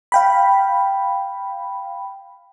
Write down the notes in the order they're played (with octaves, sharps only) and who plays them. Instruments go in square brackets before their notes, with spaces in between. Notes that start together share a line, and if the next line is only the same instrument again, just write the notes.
[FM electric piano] F5 G5 B5